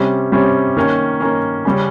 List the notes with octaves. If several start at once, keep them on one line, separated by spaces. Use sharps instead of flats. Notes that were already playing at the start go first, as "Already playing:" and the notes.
Already playing: C3 G3 C#4
C3 G3 C#4
D#3 A#3 C#4
D#3 A#3 C#4
C#3 G3 C#4